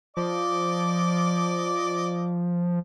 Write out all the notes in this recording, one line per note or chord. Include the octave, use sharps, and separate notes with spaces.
F3 D5 D#5 D6